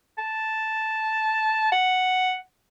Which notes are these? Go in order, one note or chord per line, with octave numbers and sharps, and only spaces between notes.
A5
F#5